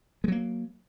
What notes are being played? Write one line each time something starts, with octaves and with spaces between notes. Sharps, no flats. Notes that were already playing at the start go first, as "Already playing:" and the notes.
F#3 G#3 A#3